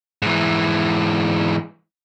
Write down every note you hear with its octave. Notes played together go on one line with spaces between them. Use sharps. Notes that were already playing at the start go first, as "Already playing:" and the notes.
G#2 E3